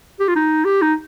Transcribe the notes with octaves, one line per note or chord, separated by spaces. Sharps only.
G4
F4
D#4
G4
D#4